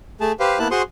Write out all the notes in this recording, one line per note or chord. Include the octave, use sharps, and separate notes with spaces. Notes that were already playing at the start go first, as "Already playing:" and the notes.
A3 G#4 A5
G4 B4 C5 F5
A#3 B3 E4 A5 F#6
F#4 G#4 C5 C6 C#6 D#6